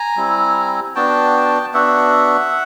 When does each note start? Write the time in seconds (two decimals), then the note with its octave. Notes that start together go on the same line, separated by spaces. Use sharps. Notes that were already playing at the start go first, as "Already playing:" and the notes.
Already playing: G#5 A#5
0.17 G3 C4 E4
0.95 B3 D4 F#4 G5 A5
1.74 B3 D4 F#4 E5 F#5